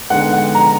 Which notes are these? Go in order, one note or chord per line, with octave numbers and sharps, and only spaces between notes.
D3 G#3 B3 D#4 F#5
F#5
A#5